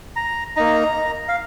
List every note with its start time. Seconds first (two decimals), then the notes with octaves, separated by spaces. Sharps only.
0.16 A#5
0.56 A#3 D#4 A#5
1.29 F5